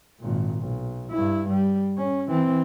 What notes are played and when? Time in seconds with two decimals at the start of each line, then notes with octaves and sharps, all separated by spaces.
0.20 G#1 A#2
0.60 B1
1.11 G2 E4
1.50 G3
1.98 C#4
2.28 E3 C4